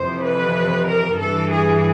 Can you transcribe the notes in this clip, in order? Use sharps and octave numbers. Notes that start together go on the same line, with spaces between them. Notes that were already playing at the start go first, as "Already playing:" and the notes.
Already playing: F2 C3 E3 C5
B4
A#4
G2 E3 A4
G#4